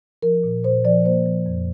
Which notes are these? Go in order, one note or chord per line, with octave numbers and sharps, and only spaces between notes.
F3 A#4
A#2
A#2 C5
F3 D5
A#3 C5
F3
F2